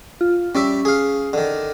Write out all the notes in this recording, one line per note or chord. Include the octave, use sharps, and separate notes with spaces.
F4
G3 C#4 D5 E5
G#4 F5
D3 D#3